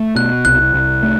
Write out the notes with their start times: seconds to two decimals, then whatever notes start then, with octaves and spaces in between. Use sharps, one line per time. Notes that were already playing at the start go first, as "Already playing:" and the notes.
Already playing: A3
0.16 B2 F#6
0.45 C2 F#6
0.74 C2
1.03 A3